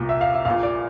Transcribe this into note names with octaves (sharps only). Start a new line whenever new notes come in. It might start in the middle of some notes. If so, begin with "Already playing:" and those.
Already playing: C2 A#2
E5
F5
E5
A#1 A#2 F5
D5